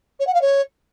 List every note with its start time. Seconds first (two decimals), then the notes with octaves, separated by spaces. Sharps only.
0.20 C#5
0.27 F#5
0.34 F5
0.42 C#5